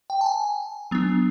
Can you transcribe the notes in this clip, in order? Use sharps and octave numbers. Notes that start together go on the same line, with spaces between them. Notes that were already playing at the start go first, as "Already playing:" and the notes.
G5
A5
G#5
F#3 B3 D4